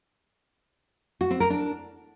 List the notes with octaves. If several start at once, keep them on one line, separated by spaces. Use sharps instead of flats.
F#4
C4
A#4
D4